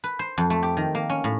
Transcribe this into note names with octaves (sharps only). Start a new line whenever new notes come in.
B4
C5
F2
A3
G4
D#3
A#3
C#4
A2